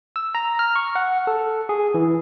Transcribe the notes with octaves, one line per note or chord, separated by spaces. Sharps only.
E6
A#5
F6
C#6
F#5
A4
G#4
E3